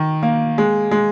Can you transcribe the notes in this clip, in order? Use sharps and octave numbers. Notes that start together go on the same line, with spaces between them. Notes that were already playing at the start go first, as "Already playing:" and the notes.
Already playing: D#3
A#3
G#3
G#3